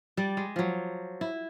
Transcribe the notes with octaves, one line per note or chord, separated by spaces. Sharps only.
G3 D5
G#3
F3 F#3
E4